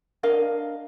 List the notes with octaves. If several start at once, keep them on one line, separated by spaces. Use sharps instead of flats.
D4 A#4 D#5 F5